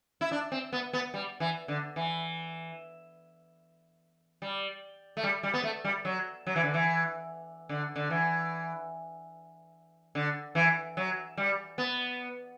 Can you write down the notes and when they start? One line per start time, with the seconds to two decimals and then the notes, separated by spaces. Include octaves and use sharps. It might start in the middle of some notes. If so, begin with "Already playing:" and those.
0.21 E4
0.32 D4
0.52 C4
0.73 B3
0.93 B3
1.14 G3
1.40 E3
1.68 D3
1.96 E3
4.42 G3
5.17 A3
5.23 G3
5.43 G3
5.54 B3
5.63 A3
5.84 G3
6.05 F#3
6.47 F#3
6.56 E3
6.64 D3
6.74 E3
7.69 D3
7.96 D3
8.10 E3
10.15 D3
10.55 E3
10.97 F#3
11.37 G3
11.78 B3